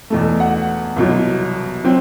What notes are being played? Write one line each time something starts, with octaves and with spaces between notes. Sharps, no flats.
E2 B2 A3
F#5
C2 B2 F#3
F#3 C4